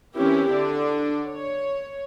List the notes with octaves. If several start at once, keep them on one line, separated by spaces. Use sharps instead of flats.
E3 C4 C#4 E4 G4 A#4
D3 D4 D5
C#5